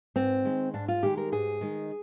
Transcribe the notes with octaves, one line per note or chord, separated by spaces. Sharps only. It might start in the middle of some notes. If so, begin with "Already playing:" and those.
G#2 C4
D#3 G#3
G#2 D4
F4
D#3 G#3 G4
A#4
G#2 G#4
D#3 G#3